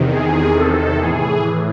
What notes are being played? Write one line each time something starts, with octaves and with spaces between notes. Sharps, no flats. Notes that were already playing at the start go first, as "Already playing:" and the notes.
Already playing: E2 C3 D#3
G#4
A4
A2 E3 G#4